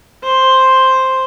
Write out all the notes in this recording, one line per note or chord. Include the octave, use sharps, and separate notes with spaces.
C5